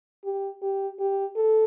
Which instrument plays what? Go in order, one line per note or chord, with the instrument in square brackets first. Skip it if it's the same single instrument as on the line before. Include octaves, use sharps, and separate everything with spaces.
[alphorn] G4
G4
G4
A4